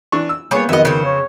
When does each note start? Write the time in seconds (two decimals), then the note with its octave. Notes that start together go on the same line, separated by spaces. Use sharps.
0.12 E3 D4 C#6
0.29 E6
0.51 G3 A#3 B3 G#4 C#5
0.69 F2 D#3 F#3 B3 D#5 E5
0.85 C#3 C5
1.05 C#5